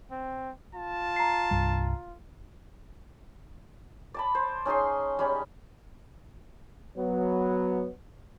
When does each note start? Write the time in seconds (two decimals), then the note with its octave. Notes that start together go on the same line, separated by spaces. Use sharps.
0.11 C4
0.75 F4 A5
1.16 A#5 C7
1.51 C2 G2 G3
4.14 D5 A5 B5
4.35 C5
4.65 C#4 D#4 G#4 C6
5.19 G3 G#3 C#4
6.96 F#3 B3